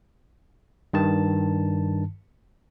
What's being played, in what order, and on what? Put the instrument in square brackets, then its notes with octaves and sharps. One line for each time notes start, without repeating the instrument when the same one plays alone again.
[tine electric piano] G2 D#3 A5